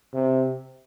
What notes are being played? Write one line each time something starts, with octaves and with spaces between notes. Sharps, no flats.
C3